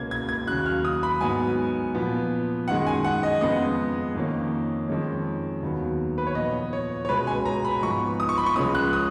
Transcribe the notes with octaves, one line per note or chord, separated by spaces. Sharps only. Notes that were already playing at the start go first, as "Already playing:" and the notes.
Already playing: C#2 B2 A#3 C#4 G#6
G#6
G#6
D#2 C#3 F#3 F#6
F6
D#6
B5
G#2 F#3 B3 G#5
A#2 F3 B3
F#2 D#3 G#3 F#5
G#5
F#5
D#5
F2 C#3 G#3 B3 D#5
F2 D#3 A#3 C#4
F2 D#3 G#3 C#4
D#2 D#3 F#3 B3
B4
C#5
A#2 F3 B3 D#5
C#5
C#5
C#2 B2 G#3 B4
G#5
A#5
B5
G#2 F3 B3 C#6
D#6
C#6
B5
C#6
C#2 C#3 F3 G#3 C#4 D#6
F#6
D#6